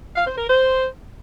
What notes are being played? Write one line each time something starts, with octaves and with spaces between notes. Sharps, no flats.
F5
C5
A#4
C5